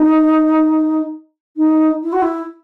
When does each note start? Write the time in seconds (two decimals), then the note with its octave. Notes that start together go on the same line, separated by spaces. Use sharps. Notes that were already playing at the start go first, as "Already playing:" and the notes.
Already playing: D#4
1.57 D#4
2.03 E4
2.12 F#4
2.22 E4